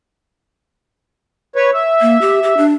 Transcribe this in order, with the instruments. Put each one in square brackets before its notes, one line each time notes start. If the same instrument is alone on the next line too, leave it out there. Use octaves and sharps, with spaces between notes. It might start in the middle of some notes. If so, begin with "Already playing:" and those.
[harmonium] B4 C#5
E5
[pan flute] A#3
G4
G4
D4